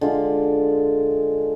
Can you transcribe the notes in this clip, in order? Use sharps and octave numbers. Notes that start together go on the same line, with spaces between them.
D3 G#3 F4